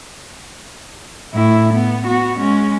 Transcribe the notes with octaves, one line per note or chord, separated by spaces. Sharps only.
A2 E4
B3
B3 F#4
G#3 C#4